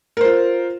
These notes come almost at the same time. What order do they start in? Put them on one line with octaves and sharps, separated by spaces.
A#4 C5 F4